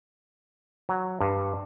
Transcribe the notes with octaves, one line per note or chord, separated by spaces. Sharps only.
F#3
G2